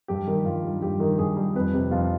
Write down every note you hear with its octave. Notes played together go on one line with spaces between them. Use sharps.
G2 G4
D#3
G2 F4
G3
G2 G4
D#3
G2 G#4
G3
F2 B4
C3 G4
F2 F4